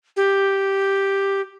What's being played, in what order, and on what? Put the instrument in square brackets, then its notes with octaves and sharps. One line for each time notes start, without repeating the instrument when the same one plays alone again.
[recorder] G4